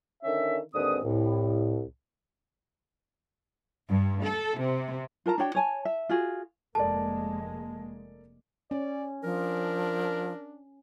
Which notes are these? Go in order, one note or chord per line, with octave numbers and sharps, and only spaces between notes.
D3 D#3 C#4 E5
D#2 G#2 D3 C4 B4 D#6
C2 A2
G2
A4
C3
F4 A#4 A5 A#5
D4 F#4 C#5 G5
C#5 G#5 A5
E5
F4 F#4 G#4
F1 G#3 A#3 A4 A#4 D5 A5
C#4 D5
F3 D4 A#4